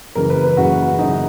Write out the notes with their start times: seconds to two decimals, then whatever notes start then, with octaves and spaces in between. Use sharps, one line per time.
0.15 F#1 F#2 C#3 E3 A#4
0.30 B4
0.44 B4
0.57 F#1 F#2 C#3 E3 F#4
0.98 F#1 F#2 C#3 E3 D#4